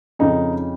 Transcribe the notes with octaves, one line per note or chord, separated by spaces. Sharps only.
F2 C#3 D#4